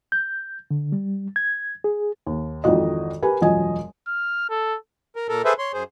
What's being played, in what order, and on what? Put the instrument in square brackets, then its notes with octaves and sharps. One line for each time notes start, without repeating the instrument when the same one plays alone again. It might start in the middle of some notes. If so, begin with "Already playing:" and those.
[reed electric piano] G6
D3
G3
G#6
G#4
[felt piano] D#2
G#1 F2 D#3 E3 F#4 D#5
G4 A#4 B4 G#5
E1 F#2 F3 D#5 G#5
[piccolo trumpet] F6
A4
[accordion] A#4
A#2 A4 A#4
G#4 A4 B4 C5 E5
C#5 C6
F#2 G#4 C5